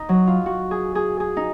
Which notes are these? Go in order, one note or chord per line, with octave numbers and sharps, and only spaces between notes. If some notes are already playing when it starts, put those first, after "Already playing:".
Already playing: D#4
F#3
F4
F#4
G#4
G#4
G#4
D#4